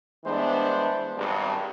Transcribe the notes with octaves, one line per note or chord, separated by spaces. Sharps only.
G2 E3 G#3 B3 D4 C5
G#1 G2